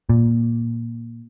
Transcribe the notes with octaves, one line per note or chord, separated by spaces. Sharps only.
A#2